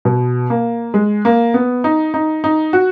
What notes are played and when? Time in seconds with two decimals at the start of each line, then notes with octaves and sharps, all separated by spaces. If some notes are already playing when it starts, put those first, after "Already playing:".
0.05 B2
0.50 A#3
0.94 G#3
1.25 A#3
1.54 B3
1.84 D#4
2.14 D#4
2.44 D#4
2.73 F#4